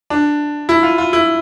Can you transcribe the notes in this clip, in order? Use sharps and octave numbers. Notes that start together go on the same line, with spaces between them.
D4
E4
F4
F4
E4